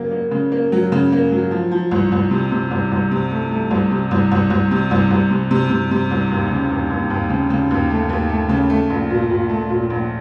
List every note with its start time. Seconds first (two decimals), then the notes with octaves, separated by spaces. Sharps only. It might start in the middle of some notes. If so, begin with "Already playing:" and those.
Already playing: C#3 F#3 A#3
0.11 A#3
0.31 C#3
0.52 A#3
0.72 F#3
0.92 C#3
1.12 A#3
1.32 F#3
1.51 F3
1.71 F3
1.91 C2
2.12 C2
2.31 C3
2.52 C3
2.71 C2
2.92 C2
3.11 C3
3.31 A3
3.51 A3
3.71 C2
3.91 C3
4.11 C2
4.32 C2
4.50 C2
4.71 C3
4.91 C2
5.11 C2
5.30 C3
5.51 C3
5.70 C3
5.91 C3
6.11 C2
6.31 D#2
6.51 C#3
6.71 D#2
6.90 D#2
7.10 D#2
7.30 C#3
7.50 C#3
7.71 D#2
7.90 A3
8.09 D#2
8.29 A3
8.49 C#3
8.70 A3
8.90 A#1
9.10 A#2
9.29 A#2
9.49 A3
9.70 A#2
9.90 A#1